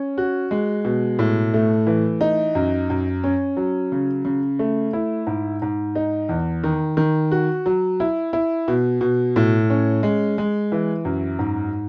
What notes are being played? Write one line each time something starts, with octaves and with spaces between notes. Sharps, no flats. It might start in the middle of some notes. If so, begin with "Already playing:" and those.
Already playing: C#4
F#4
G#3
B2
A2
A3
E3
D#4
F#2
F#2
C#4
F#3
C#3
C#3
A3
E4
G#2
G#2
D#4
E2
D#3
D#3
F#4
F#3
E4
E4
B2
B2
A2
C#4
G#3
G#3
E3
F#2
G#2